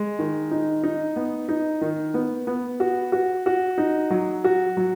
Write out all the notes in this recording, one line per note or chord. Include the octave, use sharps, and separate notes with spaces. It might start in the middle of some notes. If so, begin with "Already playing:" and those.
Already playing: G#3
D#3
D#4
D#4
B3
D#4
D#3
B3
B3
F#4
F#4
F#4
D#4
F#3
F#4
F#3